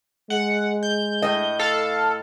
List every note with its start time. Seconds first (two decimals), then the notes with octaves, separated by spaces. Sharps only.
0.30 G#3 F#5
0.83 G6
1.22 A2 D#5
1.59 A4 F5